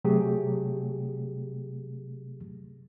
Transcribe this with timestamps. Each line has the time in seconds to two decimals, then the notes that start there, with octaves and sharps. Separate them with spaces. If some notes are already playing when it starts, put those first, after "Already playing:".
0.04 C3 F#3 A3 G4 G#4